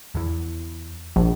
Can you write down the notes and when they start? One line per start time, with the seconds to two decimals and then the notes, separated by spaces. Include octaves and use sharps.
0.15 E2 E3
1.16 A#1